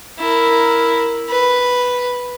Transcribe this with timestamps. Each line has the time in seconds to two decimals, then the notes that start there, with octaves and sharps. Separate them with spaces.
0.19 E4 A#4
1.29 B4